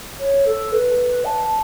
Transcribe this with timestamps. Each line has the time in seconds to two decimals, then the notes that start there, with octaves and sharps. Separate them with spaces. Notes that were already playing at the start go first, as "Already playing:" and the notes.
0.19 C#5
0.45 A4
0.72 B4
1.25 A5